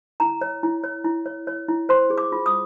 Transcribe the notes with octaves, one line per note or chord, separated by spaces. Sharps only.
E4 A#5
C#5
E4
C#5
E4
C#5
C#5
E4
C5 C6
G#4
D6
F4
D#6